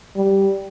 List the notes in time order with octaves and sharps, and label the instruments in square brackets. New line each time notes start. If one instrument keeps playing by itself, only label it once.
[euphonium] G3